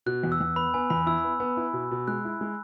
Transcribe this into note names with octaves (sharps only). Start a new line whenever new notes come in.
B2 F#6
E2
E6
E2
B3 B5
B3 G#5
E2 B5
E4 E6
B3
B3
E4
B2
B2
G#3 F#6
E4
G#3